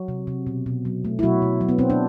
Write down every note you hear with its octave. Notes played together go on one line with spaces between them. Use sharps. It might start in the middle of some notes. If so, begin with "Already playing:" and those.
Already playing: F#3 F#4
C3
C3
B2
B2
F#3
A3
E4
B2 F#3 F#4
B2
F#3
B3
B2 C4
D4